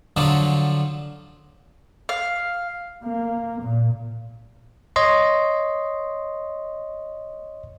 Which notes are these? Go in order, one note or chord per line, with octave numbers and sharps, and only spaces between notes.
D3 F3 F#3 D4
F5
A#3
A#2
C#5 D#5 C6